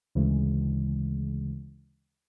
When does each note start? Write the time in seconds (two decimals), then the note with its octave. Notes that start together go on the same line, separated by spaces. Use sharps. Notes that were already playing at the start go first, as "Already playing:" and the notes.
0.15 D2 C#3 E3 G#3